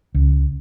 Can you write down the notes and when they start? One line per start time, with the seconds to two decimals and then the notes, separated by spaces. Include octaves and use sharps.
0.14 C#2